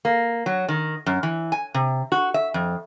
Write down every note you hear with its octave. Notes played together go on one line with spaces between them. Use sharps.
A#3
F#3
D#3
F#2
E3
G#5
C3
F#4
E5
F2